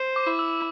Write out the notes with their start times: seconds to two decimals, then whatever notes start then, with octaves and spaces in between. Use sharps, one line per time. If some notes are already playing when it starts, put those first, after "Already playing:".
Already playing: C5
0.16 D6
0.27 E4
0.39 E6